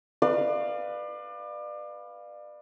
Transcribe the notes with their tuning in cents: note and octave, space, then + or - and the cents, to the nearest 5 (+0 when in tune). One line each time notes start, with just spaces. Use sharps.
B4 +0 D5 +30 F5 +0